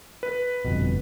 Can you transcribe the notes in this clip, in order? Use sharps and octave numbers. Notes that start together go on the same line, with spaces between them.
B4
G1 F2 B2